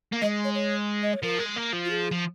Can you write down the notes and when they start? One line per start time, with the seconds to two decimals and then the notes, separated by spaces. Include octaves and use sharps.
0.12 A#3
0.22 G#3 D#5
0.44 C#5
0.55 C#5
1.03 D#5
1.13 C#5
1.23 F3 A#4
1.39 G#3
1.56 A#3
1.73 F3
1.85 F4
1.90 G#4
2.11 F3